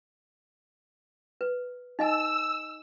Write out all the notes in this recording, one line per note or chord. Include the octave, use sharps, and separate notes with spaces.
B4
D#4 D#5 G#5 E6